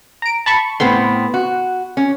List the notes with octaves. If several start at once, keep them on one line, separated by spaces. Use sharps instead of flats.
A#5 D7
A5 B5 C#6
A2 B3 C4 C6
F#4
C#4